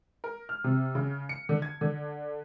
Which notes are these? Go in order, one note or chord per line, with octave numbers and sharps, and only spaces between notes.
A#4
F6
C3
C#3
C#7
D3
G#6
D3